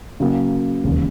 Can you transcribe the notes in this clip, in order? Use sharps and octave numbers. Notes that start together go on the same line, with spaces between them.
C#3 F#3 A#3
E1 D#2 C#3